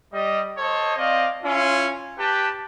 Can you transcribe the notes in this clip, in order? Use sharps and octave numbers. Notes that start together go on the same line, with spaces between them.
G3 D#5
A4 C5 C#5 D#5
C4 D5 D#5 F5
C#4 E4 F4
G4 B4 G5 A5